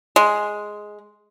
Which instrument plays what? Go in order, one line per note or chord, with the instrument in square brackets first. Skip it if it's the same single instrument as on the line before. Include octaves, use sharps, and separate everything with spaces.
[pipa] G#3